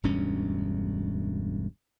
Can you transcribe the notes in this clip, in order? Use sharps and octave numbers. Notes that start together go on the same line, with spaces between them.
E1 D2 G2 C#4